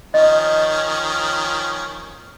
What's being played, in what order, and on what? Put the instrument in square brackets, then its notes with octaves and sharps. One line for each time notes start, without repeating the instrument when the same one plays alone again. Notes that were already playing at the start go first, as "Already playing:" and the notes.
[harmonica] D#3 F3 C#4 [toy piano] D#5